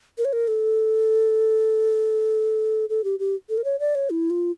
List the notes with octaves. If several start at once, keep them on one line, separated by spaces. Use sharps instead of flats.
A#4
C#5
A#4
A4
A4
G4
G4
A4
A#4
C#5
D5
C#5
E4
F4